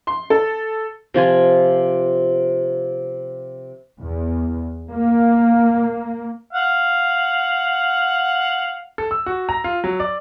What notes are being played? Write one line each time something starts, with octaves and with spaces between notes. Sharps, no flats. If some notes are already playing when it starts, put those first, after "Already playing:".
C6
A4
C3 F3 F4 G#5
E2
A#3
F5 F#5
A4
E6
F#4
A#5
F4
F#3
D5